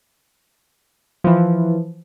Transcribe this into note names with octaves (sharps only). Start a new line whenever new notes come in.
E3 F3